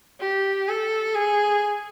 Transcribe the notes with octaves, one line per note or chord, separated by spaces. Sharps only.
G4
A4
G#4